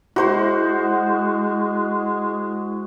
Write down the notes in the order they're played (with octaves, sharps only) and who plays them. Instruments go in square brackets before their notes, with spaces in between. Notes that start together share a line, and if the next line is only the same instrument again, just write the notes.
[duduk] G#3 [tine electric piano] E4 [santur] F#4 C5 C6